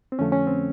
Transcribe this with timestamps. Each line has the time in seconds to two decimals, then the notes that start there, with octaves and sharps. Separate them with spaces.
0.12 C4
0.19 F2 D3 F3 A3 C#4
0.32 C#4
0.47 C4